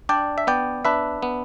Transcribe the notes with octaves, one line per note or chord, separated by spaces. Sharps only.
D4 D5 G5
E5
B3 D5 G5
D4 B4 E5
B3